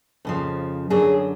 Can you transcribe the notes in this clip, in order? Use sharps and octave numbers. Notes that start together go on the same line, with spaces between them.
F2 C#3 F3
F#2 D3 F#3 G#4